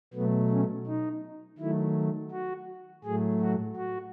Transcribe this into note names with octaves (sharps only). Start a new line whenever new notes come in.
B2 F#3 A3 B3
C#4
D#4
D#3 F#3 A3 E4
F#4
A2 F#3 A3 G#4
F#4
F#4